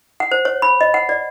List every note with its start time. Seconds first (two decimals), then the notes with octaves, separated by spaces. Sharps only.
0.20 F#5
0.31 C5
0.45 C#5
0.62 B5
0.81 D#5
0.94 F#5
1.09 D5